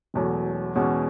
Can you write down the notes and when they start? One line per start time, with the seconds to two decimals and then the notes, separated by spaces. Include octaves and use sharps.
0.14 E1 E2 B2 F#3 A3
0.75 E2 B2 G#3 C#4 F#4